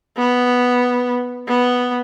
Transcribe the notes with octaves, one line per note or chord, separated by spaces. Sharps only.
B3
B3